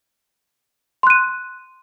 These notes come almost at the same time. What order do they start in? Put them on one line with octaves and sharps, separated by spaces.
C6 F#6 D#7